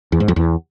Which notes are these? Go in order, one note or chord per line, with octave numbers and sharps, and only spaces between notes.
E2
G#2
F2
E2